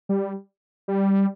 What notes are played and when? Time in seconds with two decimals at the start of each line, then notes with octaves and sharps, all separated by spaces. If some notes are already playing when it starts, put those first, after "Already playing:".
0.09 G3
0.88 G3